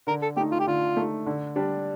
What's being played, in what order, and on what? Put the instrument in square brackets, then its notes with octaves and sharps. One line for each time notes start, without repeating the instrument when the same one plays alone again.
[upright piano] D3 [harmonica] A#4
[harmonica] A4
[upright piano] A3 [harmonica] G4
[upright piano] D#4
[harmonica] F4
G4
[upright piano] D3 [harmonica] F4
[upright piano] A3 D#4
D3
G3 D4